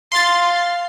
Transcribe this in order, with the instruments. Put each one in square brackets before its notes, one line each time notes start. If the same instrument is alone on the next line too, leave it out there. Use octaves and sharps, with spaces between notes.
[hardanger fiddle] F5 [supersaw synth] C6 A6